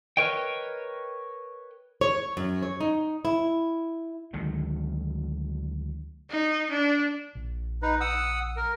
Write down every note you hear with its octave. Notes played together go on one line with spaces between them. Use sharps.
A#4 B4 C#5 D#5 G5
C#5
F#2
C#5
D#4
E4
D2 D#3 F#3 G#3
D#4
D4
A#1
D#4 B4
F#5 D#6 E6
A#4